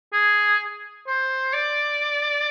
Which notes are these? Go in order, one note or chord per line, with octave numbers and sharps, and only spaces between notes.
G#4
C5
D5